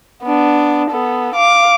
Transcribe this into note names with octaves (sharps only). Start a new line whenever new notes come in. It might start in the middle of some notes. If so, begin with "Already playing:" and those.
B3 D4
B3 A4
F5 D6